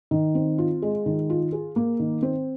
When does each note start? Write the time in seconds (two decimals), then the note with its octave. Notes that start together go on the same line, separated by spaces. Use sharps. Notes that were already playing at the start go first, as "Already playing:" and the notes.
0.11 D#3
0.35 C4
0.58 F4
0.82 G#3
1.06 D#3
1.30 F4
1.52 G#4
1.76 A#3
1.99 D#3
2.23 C4